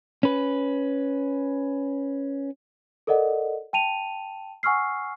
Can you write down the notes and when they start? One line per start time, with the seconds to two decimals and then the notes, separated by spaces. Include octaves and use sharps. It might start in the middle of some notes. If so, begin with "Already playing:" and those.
0.23 C#4 B4
3.07 A4 A#4 D5 D#5 F#5
3.73 G5 A5 D#7 F7
4.63 F#5 G#5 C#6 E6 F6 C7